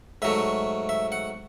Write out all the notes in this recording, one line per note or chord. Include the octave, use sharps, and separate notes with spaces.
G#2 F#3 A3 E5
E5
F#5